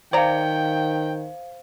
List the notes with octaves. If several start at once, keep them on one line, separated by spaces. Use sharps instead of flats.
D#3 C5 D5 F5 G5 A#5